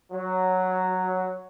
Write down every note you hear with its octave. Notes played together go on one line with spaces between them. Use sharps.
F#3